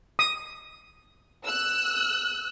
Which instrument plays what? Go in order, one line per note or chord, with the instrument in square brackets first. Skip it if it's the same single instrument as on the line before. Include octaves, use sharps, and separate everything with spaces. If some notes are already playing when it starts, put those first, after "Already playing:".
[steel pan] D#6
[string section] E6 F#6